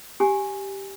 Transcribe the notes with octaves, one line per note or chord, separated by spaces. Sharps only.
G4 G#5